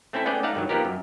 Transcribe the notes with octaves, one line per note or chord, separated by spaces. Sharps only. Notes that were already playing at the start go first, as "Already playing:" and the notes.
A3 C4 C#4 E4 A4
A3 B3 C#4 G#4 D5 G5
A3 D#4 D5 F5 F#5
G2 D#3 F#3
F3 A#3 B3 D#4 G4 A#4
F#2